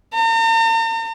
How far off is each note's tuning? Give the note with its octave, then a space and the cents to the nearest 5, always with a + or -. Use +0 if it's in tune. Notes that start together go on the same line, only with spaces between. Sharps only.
A#5 -45